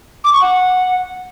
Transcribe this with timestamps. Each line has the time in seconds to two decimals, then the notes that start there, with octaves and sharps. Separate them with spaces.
0.24 D6
0.33 C#6
0.41 F#5